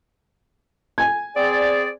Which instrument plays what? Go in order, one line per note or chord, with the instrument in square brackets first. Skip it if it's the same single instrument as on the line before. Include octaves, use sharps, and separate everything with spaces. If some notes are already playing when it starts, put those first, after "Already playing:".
[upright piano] G#5 G#6
[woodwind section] C4 G#4 D5